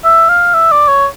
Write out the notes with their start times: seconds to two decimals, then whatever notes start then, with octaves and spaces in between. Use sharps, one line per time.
0.05 E5
0.29 F5
0.54 E5
0.72 D5
0.88 C#5